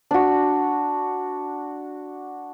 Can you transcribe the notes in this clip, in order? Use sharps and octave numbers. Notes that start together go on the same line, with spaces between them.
D4 F#4